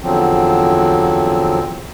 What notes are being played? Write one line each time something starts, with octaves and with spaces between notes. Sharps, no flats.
E2 D3 F3 F#3 C4